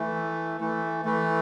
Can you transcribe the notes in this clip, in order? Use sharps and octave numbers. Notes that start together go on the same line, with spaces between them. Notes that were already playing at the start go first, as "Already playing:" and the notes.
Already playing: E3 A3
E3 A3
E3 A3